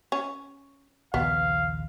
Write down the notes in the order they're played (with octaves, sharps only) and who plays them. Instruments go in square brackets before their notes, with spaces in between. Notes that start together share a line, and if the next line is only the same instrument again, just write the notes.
[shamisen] C#4
[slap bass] A#1 D#2 C#3 [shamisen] B3 [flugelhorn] F5